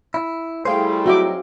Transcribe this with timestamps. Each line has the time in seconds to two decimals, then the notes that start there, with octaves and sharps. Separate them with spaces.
0.14 E4
0.65 G3 A3 E4 G#4 C5 F5 G5
1.06 F#3 C4 D#4 F#4 E5 D6